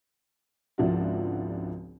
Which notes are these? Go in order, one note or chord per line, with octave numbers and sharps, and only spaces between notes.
G#1 C#2 F3 D4 E4 F#4